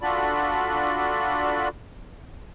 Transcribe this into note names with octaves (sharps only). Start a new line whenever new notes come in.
D4 F4 F#4 A4 D5 B5